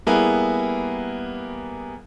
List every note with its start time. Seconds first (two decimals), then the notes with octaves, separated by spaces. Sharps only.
0.07 G3 A#3 B3 E4 G#4